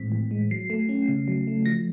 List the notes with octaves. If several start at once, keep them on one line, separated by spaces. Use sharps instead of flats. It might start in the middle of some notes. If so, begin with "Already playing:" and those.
Already playing: A2 E3 G#3 C4 B6
E3
G#3
F#3 C7
A3
C#4
C#3
F#3
A3
F3 A#6